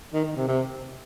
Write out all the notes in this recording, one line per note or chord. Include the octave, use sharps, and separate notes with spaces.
D#3
D#3
C3
C3